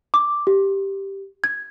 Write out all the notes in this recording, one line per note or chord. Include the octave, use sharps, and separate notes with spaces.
D6
G4
G#6